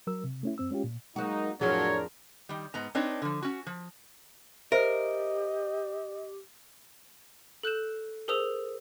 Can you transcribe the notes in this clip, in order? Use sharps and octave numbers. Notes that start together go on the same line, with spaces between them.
F#3 A#4 E6
C3
A3 C#4 E4
F#2 C4 E6
G#3 C#4 F4 G4
A#2
F#3 G#3 A#3 D#4 F#4
F2 A2 F3 F#3 D4 G#4 A#4 C#5
D#3 G3
G#2 B3 A#5
C4 D4 D#4 B4 C#5
D3 F3
C#4 F#4
F3
G4 A#4 C5 D#5 E5
A4 F#6 G6 E7
G#4 A#4 C5 D#6 E6 F7